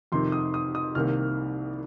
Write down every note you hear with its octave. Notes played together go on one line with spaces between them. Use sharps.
F2 C3 D#3 C6
D#6
D#6
D#6
C2 C3 D#3 A#3 F6